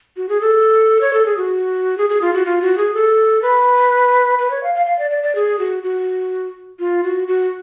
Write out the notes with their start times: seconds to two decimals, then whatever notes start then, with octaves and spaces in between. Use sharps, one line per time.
0.17 F#4
0.29 G#4
0.41 A4
1.01 C#5
1.13 A4
1.26 G#4
1.37 F#4
1.98 G#4
2.09 G#4
2.22 F4
2.34 F#4
2.46 F4
2.62 F#4
2.78 G#4
2.94 A4
3.42 B4
4.39 B4
4.51 C#5
4.63 F5
4.75 F5
4.86 F5
4.99 D5
5.11 D5
5.23 D5
5.35 G#4
5.59 F#4
5.83 F#4
6.79 F4
7.04 F#4
7.28 F#4